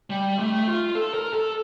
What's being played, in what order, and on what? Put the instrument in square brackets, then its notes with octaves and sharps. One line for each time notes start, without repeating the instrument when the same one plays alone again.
[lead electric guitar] G3
A3
F4
A4
A#4
A4